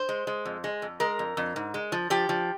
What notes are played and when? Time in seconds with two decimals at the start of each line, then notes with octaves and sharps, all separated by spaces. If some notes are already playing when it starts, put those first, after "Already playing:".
Already playing: C5
0.09 G#3
0.27 G#3
0.45 F2
0.64 G#3
0.82 F2
1.00 G#3 A#4
1.19 F2
1.37 F2
1.56 G#2
1.74 G#3
1.92 F3
2.10 F3 G4
2.29 F3